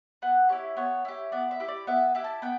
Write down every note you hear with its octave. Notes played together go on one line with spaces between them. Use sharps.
B3 F#5
E4 G4 C#5
B3 C#5
E4 G4
B3 D5
E5
E4 G4
D5
B3 E5
E4 G4
A5
B3 G5